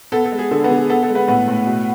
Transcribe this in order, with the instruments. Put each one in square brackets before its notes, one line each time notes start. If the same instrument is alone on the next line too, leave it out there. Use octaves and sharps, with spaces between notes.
[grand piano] B3 A4
A4
G#3
G#4
D3 A4
B3 B4
D3
G#4
B3 A4
A4
G#3
B3 B4
A2 B3 B4
A2
B2